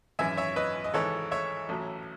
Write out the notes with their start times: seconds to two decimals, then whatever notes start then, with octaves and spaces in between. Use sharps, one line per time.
0.19 G#1 F#2 E3 E5 G#5
0.37 C#5 E5
0.56 B4 D#5
0.84 D#5
0.94 G#1 G#2 E3 A4 C#5
1.31 C#5 E5
1.69 A1 A2 F#3